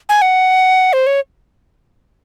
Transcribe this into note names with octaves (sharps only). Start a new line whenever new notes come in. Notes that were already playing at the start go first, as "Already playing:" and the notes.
G#5
F#5
C5
C#5